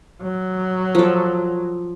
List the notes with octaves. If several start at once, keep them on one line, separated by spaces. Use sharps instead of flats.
F#3
F3 A4